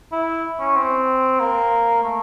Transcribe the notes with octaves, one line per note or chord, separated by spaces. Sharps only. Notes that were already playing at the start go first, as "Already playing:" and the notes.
E4
C#4
C4
A#3
A3